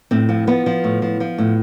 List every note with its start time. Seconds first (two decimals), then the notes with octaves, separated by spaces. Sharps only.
0.11 A2 C4
0.29 F3
0.47 F3 B3
0.66 F3
0.84 A2
1.02 F3
1.20 F3
1.38 A2